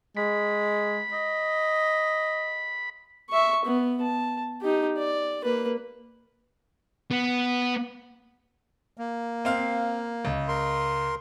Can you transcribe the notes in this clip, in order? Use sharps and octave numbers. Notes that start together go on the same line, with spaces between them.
G#3 B5
D#5
E5 C#6
B3
A5
D#4 G4
D5
A#3 B4
B3
A#3
C4 F5
C#2
A#4 C6